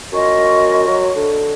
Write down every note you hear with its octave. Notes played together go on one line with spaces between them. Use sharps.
F#2 F4 D#5 C#6
F#3
D3